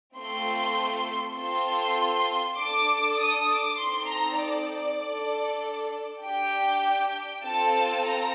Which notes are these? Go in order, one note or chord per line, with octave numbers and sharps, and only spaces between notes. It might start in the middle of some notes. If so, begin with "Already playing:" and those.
A3 C4 F4 A4 C6
C4 F4 A4 C6
D4 A4 D6
D#6
D6
C4 D#4 A4 C6
A#5
D5
D4 A4
D4 G4 G5
C4 F4 A4 A5
A#5